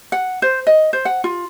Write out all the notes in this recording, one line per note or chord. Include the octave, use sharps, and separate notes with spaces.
F#5
C5
D#5
C5
F#5
F4